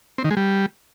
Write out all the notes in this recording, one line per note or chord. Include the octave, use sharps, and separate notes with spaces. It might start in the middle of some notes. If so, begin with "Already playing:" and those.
C4
D#3
G#3
G3